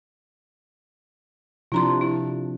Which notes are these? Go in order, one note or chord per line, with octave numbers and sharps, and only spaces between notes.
C3 F3 D4 E4 A#5 C6
E4